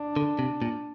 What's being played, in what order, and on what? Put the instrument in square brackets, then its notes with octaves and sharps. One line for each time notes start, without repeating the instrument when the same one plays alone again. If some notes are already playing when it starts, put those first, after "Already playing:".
Already playing: [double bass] D4
[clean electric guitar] D3
C3
A#2